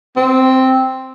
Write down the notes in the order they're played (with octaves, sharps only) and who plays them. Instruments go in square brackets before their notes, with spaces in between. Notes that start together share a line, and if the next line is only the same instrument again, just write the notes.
[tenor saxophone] C4